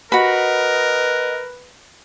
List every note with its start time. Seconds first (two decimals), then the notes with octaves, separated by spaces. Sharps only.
0.12 F#4 A#4 B4 D#5 B5